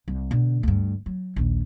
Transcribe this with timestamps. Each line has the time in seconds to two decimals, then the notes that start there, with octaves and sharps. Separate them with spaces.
0.08 C2
0.31 B2 D3
0.63 D2 G2
1.06 F#3
1.36 A#1 D#2